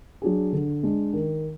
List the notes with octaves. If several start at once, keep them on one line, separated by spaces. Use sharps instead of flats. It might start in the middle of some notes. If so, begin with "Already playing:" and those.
F#3 D4 G#4
D3
G#3 D4
D#3